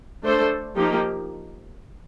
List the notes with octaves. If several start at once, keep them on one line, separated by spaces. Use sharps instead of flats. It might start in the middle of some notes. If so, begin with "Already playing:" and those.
A3 D4 A4 C5
F3 A#3 D#4 G4